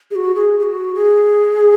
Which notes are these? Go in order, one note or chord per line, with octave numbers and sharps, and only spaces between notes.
G#4
F#4
G#4
G#4
F#4
G#4